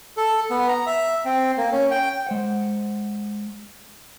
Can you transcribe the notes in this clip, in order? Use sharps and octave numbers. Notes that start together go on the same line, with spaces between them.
A4
B3
A#5
E5
C4
A#3
C#4
G5
G#3 C5 F#5